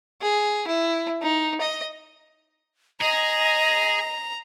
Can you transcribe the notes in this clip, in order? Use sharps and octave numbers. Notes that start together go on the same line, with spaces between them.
G#4
E4
D#4
D#5
G#4 D#5 A#5